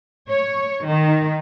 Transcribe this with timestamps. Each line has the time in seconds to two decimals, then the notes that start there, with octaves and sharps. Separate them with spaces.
0.30 C#5
0.86 D#3